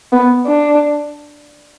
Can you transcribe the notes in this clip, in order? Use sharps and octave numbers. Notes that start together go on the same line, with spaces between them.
B3
D4